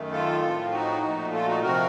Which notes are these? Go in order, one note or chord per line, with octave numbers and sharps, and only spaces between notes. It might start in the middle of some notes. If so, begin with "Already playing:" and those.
Already playing: F#2 D#3 A3
F4 A4
A2 F3 C4
D#4 F#4
A#2 F3 A3
F4 A4
D#4 F#4
C3 F3 C4 F#4 A#4